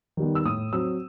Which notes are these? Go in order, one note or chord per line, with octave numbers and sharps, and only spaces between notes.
D#3 G3 B3
E6
A2 D#6
F#3 C4 E6